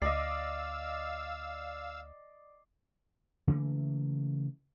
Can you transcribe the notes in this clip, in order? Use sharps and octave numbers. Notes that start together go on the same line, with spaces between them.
D2 D5 D#5 F5 D6 E6 C7
C#3 E3 A3 A#3